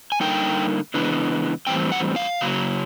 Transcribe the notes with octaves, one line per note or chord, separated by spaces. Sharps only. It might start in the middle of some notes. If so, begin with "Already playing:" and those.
G#5
D3 G3 A#3 D#4 G5
C#3 E3 G#3 B3 D4
A2 E3 G3 C4 G5
F#5
F5
C#3 F#3 A#3